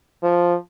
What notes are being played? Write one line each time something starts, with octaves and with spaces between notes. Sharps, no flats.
F3